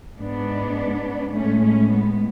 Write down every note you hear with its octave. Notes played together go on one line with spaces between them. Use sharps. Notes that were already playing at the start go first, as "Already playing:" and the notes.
G#2 G#3 B3 D4
A2 G#3 A3 C#4
A3 C#4
B3